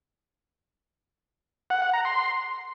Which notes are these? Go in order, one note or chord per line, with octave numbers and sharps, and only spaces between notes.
F#5
F#5
A#5
C6